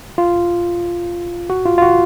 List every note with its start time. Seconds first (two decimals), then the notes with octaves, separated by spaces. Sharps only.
0.18 F4
1.50 F#4
1.65 F4
1.78 F4
1.82 F#4